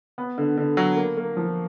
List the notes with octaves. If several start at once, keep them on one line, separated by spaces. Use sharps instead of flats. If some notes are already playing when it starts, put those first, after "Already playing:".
B3
D3
D3
F#3
A#3
A#3
F3